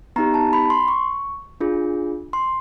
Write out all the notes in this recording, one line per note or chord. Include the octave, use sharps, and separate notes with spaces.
B3 D#4 G4 A#5
A5
B5
C6
C#6
D4 F4 G#4
C6